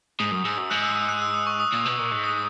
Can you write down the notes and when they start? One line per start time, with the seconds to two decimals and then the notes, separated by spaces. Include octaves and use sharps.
0.19 G#2 D#6
0.31 F#2
0.45 G#2 E6
0.58 F#2
0.70 G#2 F#6
0.83 E6
0.96 E6
1.09 F#6
1.22 E6
1.34 D#6
1.47 C#6
1.60 D#6
1.72 A#2
1.86 B2
1.99 A#2
2.11 G#2
2.24 D#6